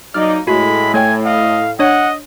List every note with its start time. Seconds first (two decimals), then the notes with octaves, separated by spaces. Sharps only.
0.14 F#3 A#3 D#4 D5 F6
0.47 A2 G#3 F#4 B5
0.94 A3 C#5 G5 G#5
1.25 D#5 F5
1.79 D4 C#5 D#5 F#5